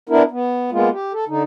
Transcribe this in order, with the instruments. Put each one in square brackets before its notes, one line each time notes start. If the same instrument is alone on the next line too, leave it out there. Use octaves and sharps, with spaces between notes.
[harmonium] B3 D4 E4 A#4
B3
G#3 A#3 B3 F4
G4
A4
D3 D#4